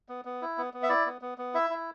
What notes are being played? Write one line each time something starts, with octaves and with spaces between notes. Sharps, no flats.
B3
B3
E4
B3
B3
E5
E4 D5
B3
B3
B3
E4 E5
E4